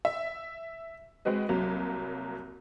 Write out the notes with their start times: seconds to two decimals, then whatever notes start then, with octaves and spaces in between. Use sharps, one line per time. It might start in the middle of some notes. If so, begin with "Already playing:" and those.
0.05 E5
1.25 G#3 C4 F#4 B4 D#5
1.49 C2 F#3 A#3